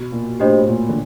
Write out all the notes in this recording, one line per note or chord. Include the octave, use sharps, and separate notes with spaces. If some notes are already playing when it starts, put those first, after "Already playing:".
Already playing: B2
A#2
A2 D4 G4 C5 D#5
A2
A#2
D3